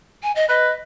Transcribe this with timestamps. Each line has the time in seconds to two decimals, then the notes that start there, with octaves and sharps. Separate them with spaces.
0.23 G#5
0.36 D#5
0.49 B4 D#5